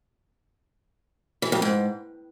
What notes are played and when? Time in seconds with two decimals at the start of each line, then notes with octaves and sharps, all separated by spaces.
1.42 E3
1.52 F2
1.62 G#2